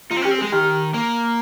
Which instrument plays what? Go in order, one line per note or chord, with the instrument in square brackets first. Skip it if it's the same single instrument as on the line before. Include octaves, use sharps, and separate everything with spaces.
[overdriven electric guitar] D#4 [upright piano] F4
[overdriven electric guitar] C4
[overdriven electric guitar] C#4 [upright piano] G4
[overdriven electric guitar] C4
[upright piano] G#4
[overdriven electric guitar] G#3
[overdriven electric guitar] D#3 [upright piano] G4
[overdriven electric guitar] A#3